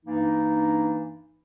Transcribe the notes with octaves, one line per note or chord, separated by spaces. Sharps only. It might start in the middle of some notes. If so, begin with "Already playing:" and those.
G2 E3 A#3 D4 D#4